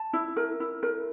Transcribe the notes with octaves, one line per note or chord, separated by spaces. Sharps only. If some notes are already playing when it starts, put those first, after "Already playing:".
Already playing: A5
E4
A#4
E4
A#4